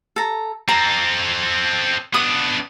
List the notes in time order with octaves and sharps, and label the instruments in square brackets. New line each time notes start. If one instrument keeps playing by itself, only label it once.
[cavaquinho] A4 A#5
[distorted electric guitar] C4 A4 [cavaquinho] A#5
[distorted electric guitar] B3 D4 [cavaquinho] D#6